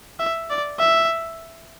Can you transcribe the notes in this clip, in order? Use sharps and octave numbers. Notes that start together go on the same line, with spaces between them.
E5
D5
E5